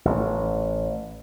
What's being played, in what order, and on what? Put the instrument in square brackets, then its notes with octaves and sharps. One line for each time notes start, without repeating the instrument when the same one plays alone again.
[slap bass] A1